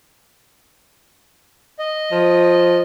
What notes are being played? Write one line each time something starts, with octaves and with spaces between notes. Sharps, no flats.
D#5
F3